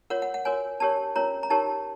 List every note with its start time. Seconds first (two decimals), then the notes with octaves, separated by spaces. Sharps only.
0.10 F4 A#4 C#5 F#5
0.22 F#5
0.34 F#5
0.45 F#4 A#4 C#5 G#5
0.80 D4 G4 A#4 C#5 A5
1.16 C#4 F4 A#4 C#5 A#5
1.43 A#5
1.50 D#4 G4 A#4 C#5 A5